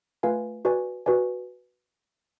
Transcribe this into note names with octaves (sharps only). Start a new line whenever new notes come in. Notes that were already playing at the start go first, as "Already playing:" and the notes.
A3 F4 B4 F5 G#5
F#4 B4 D5 G#5
F#4 B4 D5 G#5